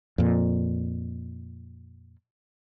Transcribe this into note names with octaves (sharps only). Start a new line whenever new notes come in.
F2 A#2